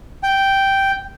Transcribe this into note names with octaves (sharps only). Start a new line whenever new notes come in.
G5